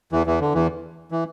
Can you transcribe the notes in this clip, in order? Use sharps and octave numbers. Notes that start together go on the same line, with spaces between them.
E2 E3
E2 E3
D3
E2 E3
E3